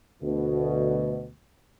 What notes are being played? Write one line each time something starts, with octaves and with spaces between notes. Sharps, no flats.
D2 B2